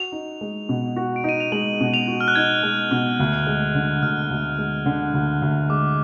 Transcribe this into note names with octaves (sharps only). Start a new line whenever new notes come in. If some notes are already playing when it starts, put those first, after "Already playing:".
Already playing: F#4 F7
D#4
G#3
B2
F#4
D7
D#4 D#7
F7
G#3 F#7
B2
F7
F#4
F6
F#6
D#4 G#6
G#3
B2
D2
G#3
D3
D2 F6
D2
G#3
D3
D2
D2
G#3 D6